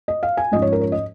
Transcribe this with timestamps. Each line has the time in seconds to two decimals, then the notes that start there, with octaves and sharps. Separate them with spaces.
0.08 D#5
0.23 F5
0.37 G#5
0.52 G#2 F3 C#4 D#5
0.62 C#5
0.73 A#4
0.81 C#5
0.92 D#5